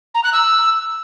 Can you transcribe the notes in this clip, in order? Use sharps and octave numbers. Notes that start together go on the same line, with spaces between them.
A#5
F#6
E6